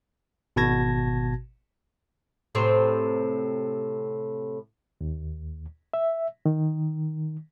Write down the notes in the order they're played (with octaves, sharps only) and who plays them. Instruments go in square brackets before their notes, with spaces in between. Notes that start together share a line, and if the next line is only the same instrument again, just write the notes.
[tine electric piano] G#1 B2 F#4 A5 G#6 A#6
[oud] A2 C3 C4
[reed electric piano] D#2
E5
D#3